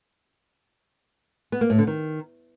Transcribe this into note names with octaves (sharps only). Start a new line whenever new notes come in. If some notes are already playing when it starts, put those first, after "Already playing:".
B3
A#3
A2
D3
D#3